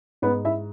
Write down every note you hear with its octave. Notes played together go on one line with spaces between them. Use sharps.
G#2 B3 B4
E4 E5